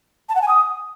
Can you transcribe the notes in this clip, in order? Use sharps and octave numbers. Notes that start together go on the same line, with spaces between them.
A5
F#5
G#5
D#6